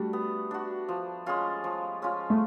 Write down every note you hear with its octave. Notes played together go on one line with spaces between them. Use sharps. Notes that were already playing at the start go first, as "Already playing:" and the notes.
Already playing: G3 A3 D4 F#4
B3
D4 F#4
F3
G#3 C#4 F4
F3
G#3 C#4 F4
A3